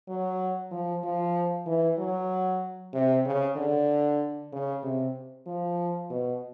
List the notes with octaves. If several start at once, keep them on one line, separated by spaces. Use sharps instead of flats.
F#3
F3
F3
E3
F#3
C3
C#3
D3
C#3
C3
F3
B2